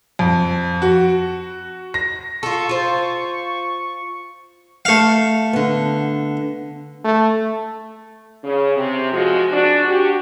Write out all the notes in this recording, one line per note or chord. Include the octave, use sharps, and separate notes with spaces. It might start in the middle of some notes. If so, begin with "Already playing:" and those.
F2
F#4
A#6
F4 A4 C#6
F4 C5
A3 F5
D3 B3
A3
C#3
C3
F3 G#3 F#4
D4 F#4
F#4 G4